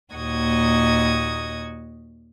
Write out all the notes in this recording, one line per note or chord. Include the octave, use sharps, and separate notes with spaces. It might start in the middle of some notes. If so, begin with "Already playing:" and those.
D#2 A#2 F#4 D#5 D#6 G#6